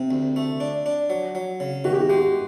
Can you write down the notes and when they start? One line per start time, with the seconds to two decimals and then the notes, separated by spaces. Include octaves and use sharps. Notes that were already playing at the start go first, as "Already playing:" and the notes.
Already playing: C3
0.11 D2
0.36 A3
0.60 D4
0.86 D4
1.10 F#3
1.35 F#3
1.60 C#3
1.84 D#3 F#4
1.93 G4
2.00 F#4
2.09 G#3 G4